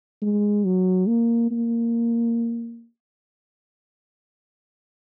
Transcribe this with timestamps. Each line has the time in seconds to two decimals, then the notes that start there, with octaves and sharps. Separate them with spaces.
0.22 G#3
0.66 F#3
1.08 A#3
1.51 A#3